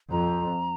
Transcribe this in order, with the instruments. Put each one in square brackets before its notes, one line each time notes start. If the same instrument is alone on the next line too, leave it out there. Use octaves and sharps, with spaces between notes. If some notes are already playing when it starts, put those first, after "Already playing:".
[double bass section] F2 [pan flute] A#5